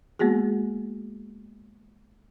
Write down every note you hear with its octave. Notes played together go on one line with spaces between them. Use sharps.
G#3 A#3 B3 F#4 G#4